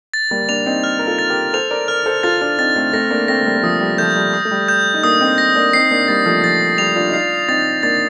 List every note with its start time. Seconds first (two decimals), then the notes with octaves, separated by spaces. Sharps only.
0.14 A6
0.31 G3 A#3
0.49 A#3 D4 F7
0.66 C4 D#4
0.84 F6
0.99 A#4
1.07 F4 A4
1.19 A6
1.30 G4 A#4
1.54 A4 C5 F7
1.71 A#4 D5
1.88 A#4 D5 F6
2.06 A4 C5
2.23 F4 A4 A6
2.41 D4 F4
2.58 C4 D#4 A6
2.76 A3 C4
2.93 A3 C4 A#6
3.11 A#3 D4
3.28 A3 C4 A#6
3.41 A3
3.46 G3 A#3
3.57 A#3
3.63 F3 A3 D#6
3.81 G3
3.98 F3 A3 G6
4.16 G3
4.33 D#6
4.45 A3
4.51 G3
4.69 G6
4.94 D#4
5.03 A#3 D4 D#6
5.20 C4 D#4
5.38 A#6
5.56 A#3 D4
5.73 C4 D#4 C7
5.91 A#3 D4
6.08 G3 A#3 A6
6.26 F3 A3
6.43 F3 A6
6.78 G3 F7
6.96 D4 F4
7.09 D#4
7.13 D4 F4 C7
7.48 C4 D#4 A6
7.83 A#3 D4 A6